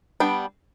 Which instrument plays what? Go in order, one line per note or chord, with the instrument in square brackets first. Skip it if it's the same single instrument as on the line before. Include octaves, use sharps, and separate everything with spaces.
[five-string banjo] G3 B3 D4 G5